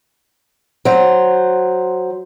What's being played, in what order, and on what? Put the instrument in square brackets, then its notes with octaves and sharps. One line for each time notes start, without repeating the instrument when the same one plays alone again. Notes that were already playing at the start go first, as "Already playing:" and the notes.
[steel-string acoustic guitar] F#3 C5